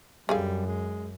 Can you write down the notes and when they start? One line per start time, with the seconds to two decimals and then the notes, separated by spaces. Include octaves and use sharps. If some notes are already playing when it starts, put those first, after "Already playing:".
0.29 F#2 D3 G3 G#4 F5
0.67 G#3